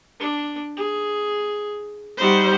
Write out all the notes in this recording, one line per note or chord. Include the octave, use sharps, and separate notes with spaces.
D4
G#4
G3 D#4 F#4 C5